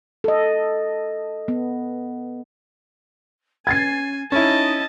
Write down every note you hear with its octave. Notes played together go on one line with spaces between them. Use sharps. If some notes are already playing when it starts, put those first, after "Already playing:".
A4 D#5
B3
C#4 G#5 G#6 A6 C7
C#4 D#4 E4 D#5 A5